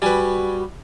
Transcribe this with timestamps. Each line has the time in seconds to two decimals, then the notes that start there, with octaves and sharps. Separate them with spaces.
0.02 G3 F#4 B4 D5 G#5